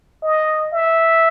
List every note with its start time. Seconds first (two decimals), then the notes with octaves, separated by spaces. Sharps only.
0.23 D#5
0.73 E5